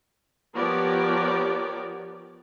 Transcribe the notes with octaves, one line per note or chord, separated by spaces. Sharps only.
F3 B3 G4 A#4 C#5 D5